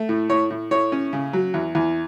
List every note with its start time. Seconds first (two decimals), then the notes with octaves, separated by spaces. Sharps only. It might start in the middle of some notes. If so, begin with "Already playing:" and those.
Already playing: A3
0.09 A2
0.29 A2 C#5
0.50 A2
0.71 A2 C#5
0.92 C#4
1.13 C#3
1.33 F#3
1.54 E2
1.75 E2